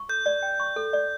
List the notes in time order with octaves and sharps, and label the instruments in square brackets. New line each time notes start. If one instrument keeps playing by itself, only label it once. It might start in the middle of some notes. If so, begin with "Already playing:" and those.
Already playing: [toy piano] C#6
[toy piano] A4 [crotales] G6
[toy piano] D5
G5
C#6
A4
D5